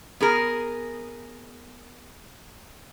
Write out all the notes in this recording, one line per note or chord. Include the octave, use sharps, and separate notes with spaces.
B3 G#4 A#4